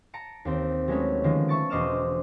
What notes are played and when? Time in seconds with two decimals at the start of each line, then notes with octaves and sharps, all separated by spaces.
0.14 A5 A#5 C#7 D7
0.45 D#2 C4
0.88 F#3 G#3 A3 B3 C#4 D#4
1.24 D3 D#3 F3 G#3
1.48 E5 A5 C#6 A6 D7
1.70 E1 C5 D#5 D6 F6 E7